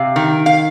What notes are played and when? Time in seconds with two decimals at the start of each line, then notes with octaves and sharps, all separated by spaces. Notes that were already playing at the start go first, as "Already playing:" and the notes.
Already playing: C3 F5
0.16 D#3
0.46 F5